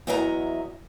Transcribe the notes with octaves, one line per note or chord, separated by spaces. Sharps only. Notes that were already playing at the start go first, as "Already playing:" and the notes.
E2 F#3 D#5 E5 G#5 A#5